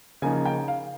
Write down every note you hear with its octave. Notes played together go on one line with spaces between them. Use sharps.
C#3 F3 A#3 D#4 G#5
G5
F5